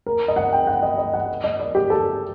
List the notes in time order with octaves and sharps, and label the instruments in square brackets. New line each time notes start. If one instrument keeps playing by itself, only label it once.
[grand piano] A#4
D#5
F#5
G5
F#5
D#5
D#5
F#5
D#5
D5
G4
A4